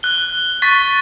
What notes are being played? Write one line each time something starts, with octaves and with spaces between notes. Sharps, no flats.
F#6 G7
C#6 A6 B6